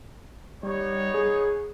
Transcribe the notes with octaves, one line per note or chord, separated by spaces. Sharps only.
G3 B3 D#4 C#5
G#4